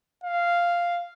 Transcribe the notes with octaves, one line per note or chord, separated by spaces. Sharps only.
F5